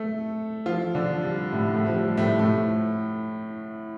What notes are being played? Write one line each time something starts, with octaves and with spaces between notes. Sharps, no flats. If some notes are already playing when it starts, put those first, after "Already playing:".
Already playing: A3 A4
F3 F4
D3 D4
G3
A2 A3
A2 A3
F3
G3
A2 A3
A2 A3